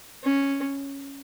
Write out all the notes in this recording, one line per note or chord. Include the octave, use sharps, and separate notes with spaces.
C#4